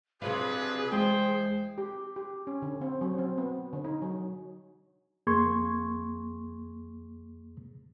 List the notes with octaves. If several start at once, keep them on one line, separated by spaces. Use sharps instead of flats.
C3 F3 F#3 D4 F4 G#4 B4
E2 G#3 C5 G5
G4
G4
C#4
D3
C4
F#3
C4
B3
D3
D#4
F#3
F2 A#3 G#4 C6 C#6 G#6